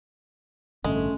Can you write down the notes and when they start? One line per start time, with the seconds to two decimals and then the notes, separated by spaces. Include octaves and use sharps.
0.84 A1 G2 D3 G#3 A3 C#4